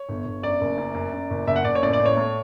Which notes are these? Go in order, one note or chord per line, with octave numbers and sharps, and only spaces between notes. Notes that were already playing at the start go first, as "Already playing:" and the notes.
Already playing: C#5
G1
G1
F#2 D5
F#1
F#2
F#2
F#2
F#1
F#1 E5
F#5
F#1 D5
C#5
A1 D5
D5
A1
C#5
A2